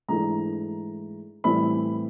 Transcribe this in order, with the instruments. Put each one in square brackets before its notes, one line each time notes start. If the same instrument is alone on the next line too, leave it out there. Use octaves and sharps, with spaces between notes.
[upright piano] G#2 E3 A3 D4 A#5
A2 E3 G3 C4 B5